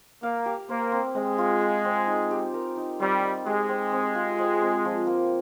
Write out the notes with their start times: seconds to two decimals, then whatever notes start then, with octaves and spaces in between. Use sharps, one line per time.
0.22 A#3 F5
0.46 G4
0.69 A#3 C5
0.92 C4
1.15 G#3 C4
1.38 F4
1.61 G#4
1.85 C4
2.07 D#4
2.31 G4
2.54 A#4
2.77 D#4
3.00 G3 C4
3.22 D#4
3.46 G#3 G4
3.69 C4
3.92 C4
4.15 F4
4.38 C5
4.62 C4
4.85 F3
5.07 A#3